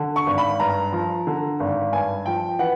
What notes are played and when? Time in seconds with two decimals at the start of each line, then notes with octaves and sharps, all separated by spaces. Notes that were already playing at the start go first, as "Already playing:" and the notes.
Already playing: D3
0.16 C#6
0.27 G#1
0.38 B5
0.60 G2 A#5
0.92 F3
1.27 D3
1.60 G#1
1.92 G2 G#5
2.26 F3 G5
2.59 E3 F#5